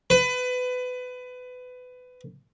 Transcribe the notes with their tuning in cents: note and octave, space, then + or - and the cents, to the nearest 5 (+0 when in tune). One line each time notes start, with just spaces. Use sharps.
B4 +25